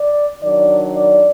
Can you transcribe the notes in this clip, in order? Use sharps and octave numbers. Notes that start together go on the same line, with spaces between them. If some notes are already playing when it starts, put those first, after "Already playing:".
Already playing: D5
D#3 F#3 D4 D5
D5